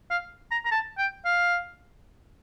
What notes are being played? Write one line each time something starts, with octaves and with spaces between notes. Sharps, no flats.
F5
A#5
A#5
A5
G5
F5